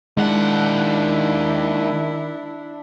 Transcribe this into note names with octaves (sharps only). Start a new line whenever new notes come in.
D#2 D#3 G#3 D4 E4 F#5